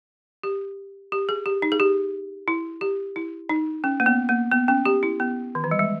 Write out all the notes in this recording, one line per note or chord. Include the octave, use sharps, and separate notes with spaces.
G4
G4
G#4
G4
D#4
G#4
G4
E4
G4
E4
D#4
C#4
A#3
B3
A#3
B3
C#4
G4
E4
B3
D#3
E3
G3
G#3